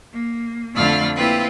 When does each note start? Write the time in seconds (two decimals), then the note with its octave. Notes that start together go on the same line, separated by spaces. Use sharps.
0.11 A#3
0.75 F2 D3 A3 F5 B5 F6
1.15 A#3 C4 E4 F4 G4 B4